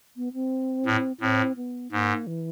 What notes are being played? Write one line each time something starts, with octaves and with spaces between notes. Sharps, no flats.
B3
C4
A2
A2 C4
B3
G#2 A#3
E3